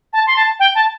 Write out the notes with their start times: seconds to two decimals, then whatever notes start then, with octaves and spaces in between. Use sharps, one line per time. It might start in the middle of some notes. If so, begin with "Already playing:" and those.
0.13 A5
0.26 C6
0.36 A5
0.59 G5
0.75 A5